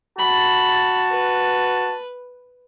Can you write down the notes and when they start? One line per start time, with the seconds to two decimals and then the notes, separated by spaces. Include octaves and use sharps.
0.19 F#4 A5 B5
1.12 B4